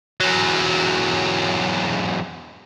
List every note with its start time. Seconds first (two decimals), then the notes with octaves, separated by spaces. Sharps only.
0.20 E2 F#3